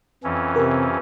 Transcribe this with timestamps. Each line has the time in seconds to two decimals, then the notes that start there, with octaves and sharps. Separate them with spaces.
0.24 F2 E3 C#4
0.56 C3 A#4